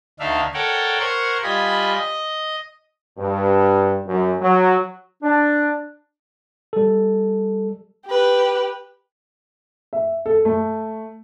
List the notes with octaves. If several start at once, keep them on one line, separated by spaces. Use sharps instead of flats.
D2 D4 D#4 E5 F5
A4 A#4 C#5 D5 F#5 G5
A#4 C5 F#5 C#6 G#6
G3 F4 D#5 G#5 B5
D#5
G2
F#2
F#3
D4
G3 A4
G4 B4
E5
A4
A3